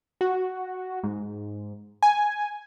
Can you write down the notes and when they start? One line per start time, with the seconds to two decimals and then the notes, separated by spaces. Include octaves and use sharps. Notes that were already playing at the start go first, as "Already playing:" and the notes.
0.21 F#4
1.03 G#2
2.03 G#5